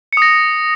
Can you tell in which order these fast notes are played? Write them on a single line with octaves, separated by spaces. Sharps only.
C#7 D#6 A#6